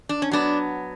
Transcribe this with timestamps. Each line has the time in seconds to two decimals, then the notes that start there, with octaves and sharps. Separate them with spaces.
0.09 D4
0.22 C#4
0.31 F#3 B3 D4